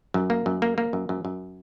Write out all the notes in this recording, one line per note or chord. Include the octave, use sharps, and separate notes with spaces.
F#2
A#3
F#2
A#3
A#3
F#2
F#2
F#2